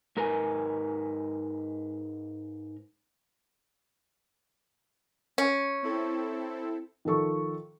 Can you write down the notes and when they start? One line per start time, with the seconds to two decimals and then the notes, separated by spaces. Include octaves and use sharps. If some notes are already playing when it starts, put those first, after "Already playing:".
0.17 G#2 A#4 B4 G#5
5.38 C#4
5.83 C4 E4 A4
7.05 D#3 F3 A4 C#6